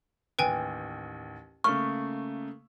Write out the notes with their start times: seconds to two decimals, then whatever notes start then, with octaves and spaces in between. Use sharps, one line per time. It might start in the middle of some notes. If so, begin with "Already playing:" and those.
0.39 A1 D#2 B4 G5 G#5
1.64 C#3 A3 A#3 C#6 F6